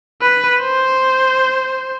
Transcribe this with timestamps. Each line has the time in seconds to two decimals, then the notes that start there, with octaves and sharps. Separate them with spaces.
0.22 B4
0.60 C5